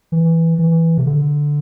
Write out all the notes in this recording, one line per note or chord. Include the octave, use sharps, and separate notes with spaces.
E3
E3
C3
D3